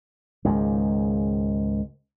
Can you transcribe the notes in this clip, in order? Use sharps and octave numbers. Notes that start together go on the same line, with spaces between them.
C#2 G#2 D#3